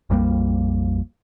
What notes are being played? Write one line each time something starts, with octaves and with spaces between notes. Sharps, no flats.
A#1 F2 G3 A#3